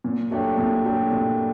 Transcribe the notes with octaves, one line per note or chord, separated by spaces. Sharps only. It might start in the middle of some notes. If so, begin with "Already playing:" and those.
A#2
F#3 A3 D4 G4
A#2
F#3 A3 D4 G4
A#2